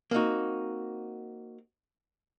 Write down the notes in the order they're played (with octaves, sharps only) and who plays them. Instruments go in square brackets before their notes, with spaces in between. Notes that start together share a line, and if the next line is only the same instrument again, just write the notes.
[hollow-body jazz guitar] A#3 C4 D#4 F#4